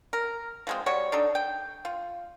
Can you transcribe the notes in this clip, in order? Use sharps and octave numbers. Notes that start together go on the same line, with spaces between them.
A#4
F3 G#3 C4
G3 F#4 C#5
D4 D#4 A4
G5
F4